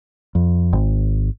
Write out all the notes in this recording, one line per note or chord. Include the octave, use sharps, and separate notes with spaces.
F2
G#1